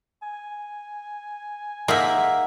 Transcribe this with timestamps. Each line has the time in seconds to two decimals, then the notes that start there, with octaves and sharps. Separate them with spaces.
0.23 G#5
1.88 G#3 A#3 D#4 E5 F#5